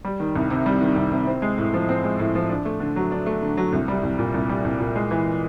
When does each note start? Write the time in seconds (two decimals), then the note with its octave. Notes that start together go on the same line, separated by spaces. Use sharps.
0.05 G3
0.20 D#3
0.36 C2
0.50 C3
0.66 G3
0.81 D#3
0.96 C2
1.12 C3
1.27 C4
1.42 G#3
1.58 A2
1.74 F3
1.89 C4
2.04 G#3
2.19 A2
2.35 F3
2.50 D4
2.65 A3
2.80 D3
2.96 F#3
3.12 D4
3.26 A3
3.42 D3
3.57 F#3
3.73 C2
3.88 G3
4.03 C2
4.19 A#2
4.34 C2
4.49 G3
4.65 C2
4.80 A#2
4.95 G#3
5.11 E3